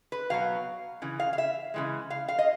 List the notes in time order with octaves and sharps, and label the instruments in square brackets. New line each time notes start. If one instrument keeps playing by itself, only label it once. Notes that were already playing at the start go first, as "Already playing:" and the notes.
[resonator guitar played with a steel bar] B4
B2 F#3 B3 F5
C#3 E3
F5
F5
E5
C#3 E3 G#3
F5
F5
D#5